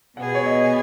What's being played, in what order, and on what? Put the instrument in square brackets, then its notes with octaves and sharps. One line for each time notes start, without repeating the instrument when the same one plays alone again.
[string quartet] B2 B3 G#4 [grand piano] F#5
[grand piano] C#5
D#5